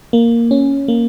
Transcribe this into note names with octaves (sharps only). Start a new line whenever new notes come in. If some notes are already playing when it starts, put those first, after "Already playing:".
A#3
C#4
A#3